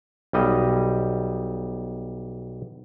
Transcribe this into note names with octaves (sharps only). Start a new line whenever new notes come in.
B1 G3 D#5